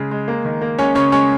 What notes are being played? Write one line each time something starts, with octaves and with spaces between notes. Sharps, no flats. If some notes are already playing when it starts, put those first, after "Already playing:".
Already playing: C#3 G#3
G#3
A#3
D#3
A#3
G#3 C#4 C#5
C#3 C#4 C#5
G#3 C#4 C#5